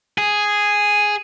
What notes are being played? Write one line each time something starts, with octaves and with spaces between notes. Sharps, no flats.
G#4